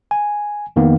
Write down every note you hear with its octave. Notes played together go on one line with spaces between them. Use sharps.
G#5
F2 D#3 A#3 B3